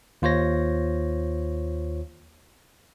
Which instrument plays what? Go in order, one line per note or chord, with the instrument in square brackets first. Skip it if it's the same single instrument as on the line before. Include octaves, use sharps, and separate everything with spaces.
[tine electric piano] D#2 F4 C5 C#5 A#6